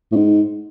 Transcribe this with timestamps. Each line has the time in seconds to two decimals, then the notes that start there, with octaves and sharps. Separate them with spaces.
0.12 A2
0.16 G#2